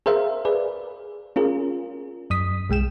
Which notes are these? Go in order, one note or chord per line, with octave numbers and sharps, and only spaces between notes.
G#4 A#4 C5 E5 F5
G#4 B4 D5
C#4 F4 G#4 A#4
F#2 D#6 B6
B1 G#3 G5 E7